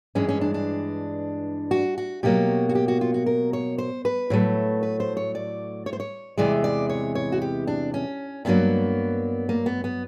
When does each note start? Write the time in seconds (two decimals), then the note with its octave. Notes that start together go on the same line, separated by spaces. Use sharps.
0.15 G2 E3 G#3 C#4
0.28 C#4
0.41 D4
0.54 D4
1.71 F#4
1.98 F#4
2.23 B2 F#3 A#3 G4
2.69 F#4
2.75 G4
2.88 F#4
3.01 F4
3.14 F#4
3.26 A#4
3.53 C#5
3.78 C5
4.05 B4
4.30 A2 F#3 A3
4.83 B4
5.00 C5
5.17 C#5
5.35 D5
5.86 C#5
5.93 C5
6.00 C#5
6.38 E2 C3 E3 G#3 D5
6.64 D5
6.89 C#5
7.15 C#5
7.32 F#4
7.41 G4
7.67 D4
7.94 C#4
8.45 G2 D3 F#3 A#3 B3
9.49 A#3
9.66 B3
9.84 B3